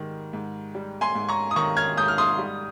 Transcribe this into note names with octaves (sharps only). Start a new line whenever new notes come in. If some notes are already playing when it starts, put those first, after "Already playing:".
Already playing: G#2 D#3 G3
G#2
G3
G#5 C6
G#2
A#5 C#6
D#6
D#3 A#5 C#6
F6 G#6
G#2 D#6 G6
F6
C6 D#6
G3